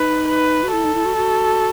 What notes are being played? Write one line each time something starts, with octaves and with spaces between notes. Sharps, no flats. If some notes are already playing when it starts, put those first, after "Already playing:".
Already playing: D#4 B4
B4
F#4
E4 A4
D#4
E4
F#4
F#4